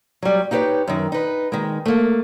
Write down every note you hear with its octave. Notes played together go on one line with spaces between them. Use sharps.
F#3 G3
D#4 E4 G4 B4 C#5
F#2 D#3
D#4 B4
D#3 G#3
A3 A#3